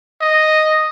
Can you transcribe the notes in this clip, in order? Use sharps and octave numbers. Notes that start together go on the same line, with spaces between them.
D#5